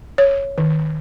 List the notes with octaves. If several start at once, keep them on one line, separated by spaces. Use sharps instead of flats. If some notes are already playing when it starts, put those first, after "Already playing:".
C#5
D#3